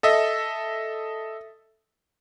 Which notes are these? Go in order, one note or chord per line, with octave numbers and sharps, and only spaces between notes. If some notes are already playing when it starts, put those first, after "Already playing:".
A4 D#5 E5